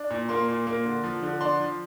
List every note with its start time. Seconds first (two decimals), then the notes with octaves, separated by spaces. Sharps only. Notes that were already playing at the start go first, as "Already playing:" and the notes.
Already playing: D4
0.10 A#2
0.29 A#3 C6
0.48 A#2
0.67 A#3
0.85 D3
1.04 F3
1.23 D3
1.41 D4 C6
1.60 F3